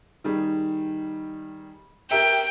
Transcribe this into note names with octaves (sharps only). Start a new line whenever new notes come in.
D#3 G3 G#4
G4 A#4 E5 G5